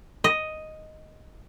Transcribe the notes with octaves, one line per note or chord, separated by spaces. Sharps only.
D#5